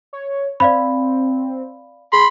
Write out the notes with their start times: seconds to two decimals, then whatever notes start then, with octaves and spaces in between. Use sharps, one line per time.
0.13 C#5
0.60 C4 D5 F5 B5
2.13 G#4 B5 C6